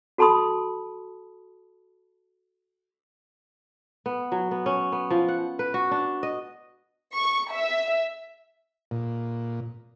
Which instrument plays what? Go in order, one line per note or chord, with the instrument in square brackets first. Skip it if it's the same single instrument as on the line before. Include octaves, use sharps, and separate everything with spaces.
[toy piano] F#4 A4 A5 B5 C6 D#6
[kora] B3
F#3
B3
C#4
B3
F3
F#5
B4
F#4
D4
D#5
[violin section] C#6
E5
[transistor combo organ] A#2